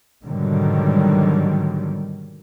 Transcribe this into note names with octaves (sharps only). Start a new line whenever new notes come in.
G#2 B2 D3 D#3 F#3 G3